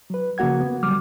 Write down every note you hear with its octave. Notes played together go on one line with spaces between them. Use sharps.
F#3 B4
C#3 F3 A#3 F#4 F#5 G#6
B3
D3 F#3 G3 D6 F6